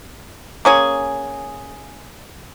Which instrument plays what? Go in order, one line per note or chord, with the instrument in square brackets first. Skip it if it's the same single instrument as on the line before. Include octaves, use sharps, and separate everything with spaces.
[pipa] A#3 C#4 G#4